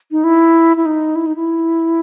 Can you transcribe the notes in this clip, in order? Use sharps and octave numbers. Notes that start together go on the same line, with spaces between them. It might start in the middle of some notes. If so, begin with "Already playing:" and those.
D#4
E4
E4
D#4
E4
D#4
E4